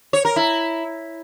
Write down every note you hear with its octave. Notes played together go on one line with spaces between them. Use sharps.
C#5
A#4
E4